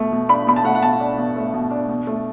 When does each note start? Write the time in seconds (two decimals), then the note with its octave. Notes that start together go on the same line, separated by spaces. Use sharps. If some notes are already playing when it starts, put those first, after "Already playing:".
Already playing: B2 A3
0.12 B2
0.29 D4 B5
0.47 B2 B5
0.56 A5
0.64 A3 F#5
0.75 F#5
0.83 B2 A5
1.00 D4
1.17 B2
1.36 A3
1.53 B2
1.71 D4
1.88 B2
2.07 A3